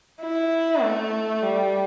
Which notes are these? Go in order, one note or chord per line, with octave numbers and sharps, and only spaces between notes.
E4
A3
G3